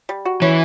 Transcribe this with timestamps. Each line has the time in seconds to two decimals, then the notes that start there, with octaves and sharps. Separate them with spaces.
0.09 G3
0.25 F#4
0.42 E3 C#4